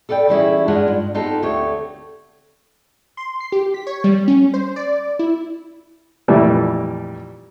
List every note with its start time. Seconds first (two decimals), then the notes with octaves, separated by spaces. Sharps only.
0.09 A4 B4 D5 F5 G5
0.29 E3 G3 C#4 E4 G4 G#4
0.68 G2 G#3 D4 F4 F#5
0.88 G2
1.14 B3 C4 D#4 F4 G4 A4
1.42 D2 A3 C4 G4 C#5
3.17 C6
3.40 C7
3.52 G4
3.74 B6
3.87 C#5
4.04 G3
4.28 C#4
4.54 C5
4.76 D5
5.19 E4
6.28 F2 A#2 E3 G3 A3